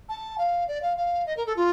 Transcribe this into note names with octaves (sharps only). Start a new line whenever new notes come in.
A5
F5
D5
F5
F5
D#5
A#4
A4
F4